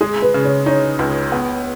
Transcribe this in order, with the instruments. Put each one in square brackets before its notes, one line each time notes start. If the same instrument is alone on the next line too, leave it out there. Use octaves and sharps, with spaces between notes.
[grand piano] G#3 [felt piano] G#4
[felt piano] B4
[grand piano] C#3
[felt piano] C#5
[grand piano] D#4 [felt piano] C#5
[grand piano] C#2
B3